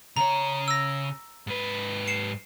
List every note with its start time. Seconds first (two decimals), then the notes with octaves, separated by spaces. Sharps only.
0.17 C#3 C#5 A#5
0.68 E6 A#6
1.47 G#2 B4
2.08 C7 C#7 E7